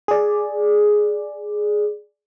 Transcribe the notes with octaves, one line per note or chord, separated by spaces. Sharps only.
G#4 D5